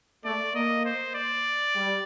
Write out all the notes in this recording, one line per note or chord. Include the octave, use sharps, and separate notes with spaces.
A3 D5
A#3 D#5
C5
D5
G3